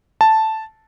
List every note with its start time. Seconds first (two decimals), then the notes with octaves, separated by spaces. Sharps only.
0.21 A5